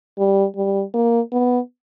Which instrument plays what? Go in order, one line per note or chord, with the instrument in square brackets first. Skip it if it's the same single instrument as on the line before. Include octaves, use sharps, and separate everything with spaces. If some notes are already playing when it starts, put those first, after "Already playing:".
[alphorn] G3
G3
A#3
B3